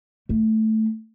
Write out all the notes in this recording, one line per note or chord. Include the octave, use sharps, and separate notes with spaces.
A3